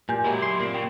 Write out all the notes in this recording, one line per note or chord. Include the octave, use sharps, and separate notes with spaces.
A#2 G4 G#5 G6
F#2 F#3 G#3 E4 A#4
C6
A#2 C4
C#3 G5